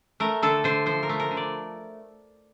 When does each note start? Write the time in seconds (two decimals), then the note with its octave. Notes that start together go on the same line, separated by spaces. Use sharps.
0.20 A3 A#4
0.42 D3 A4
0.64 D3 C5
0.86 F3 C5
1.03 A#4
1.09 A3
1.20 A#4
1.31 D3
1.37 D5